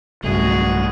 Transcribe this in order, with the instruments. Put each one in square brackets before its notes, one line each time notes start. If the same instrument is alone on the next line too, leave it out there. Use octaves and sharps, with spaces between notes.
[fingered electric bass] B1 G2 [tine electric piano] C#3 A3 [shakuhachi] F#4 [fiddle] G#4